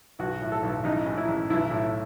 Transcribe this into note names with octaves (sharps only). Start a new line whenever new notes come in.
B1 F#4
A2
A4
B1
A1 D#4
G#2
E4
A1
B1 E4
A2